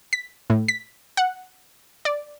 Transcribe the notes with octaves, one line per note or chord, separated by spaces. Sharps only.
B6
A2
B6
F#5
D5